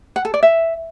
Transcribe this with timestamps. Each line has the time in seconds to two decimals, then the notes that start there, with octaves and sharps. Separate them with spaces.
0.16 F#5
0.25 A4
0.34 D5
0.43 E5